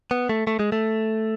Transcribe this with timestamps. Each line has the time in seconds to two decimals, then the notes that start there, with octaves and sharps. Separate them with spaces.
0.11 B3
0.29 A3
0.47 A3
0.59 G#3
0.72 A3